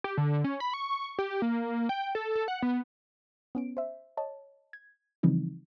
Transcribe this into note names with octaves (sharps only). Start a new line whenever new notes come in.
G4
D3
C#4
B5
C#6
G4
A#3
G5
A4
A4
F#5
B3
B3 C#4 D7
C5 E5
C#5 D#5 A5
G#6
C#3 E3 F3 G3 C4 D#4